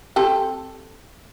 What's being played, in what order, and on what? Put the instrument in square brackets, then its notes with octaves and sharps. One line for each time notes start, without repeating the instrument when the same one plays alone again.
[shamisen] C4 G4 A4